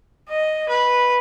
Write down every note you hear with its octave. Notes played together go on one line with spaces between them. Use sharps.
D#5
B4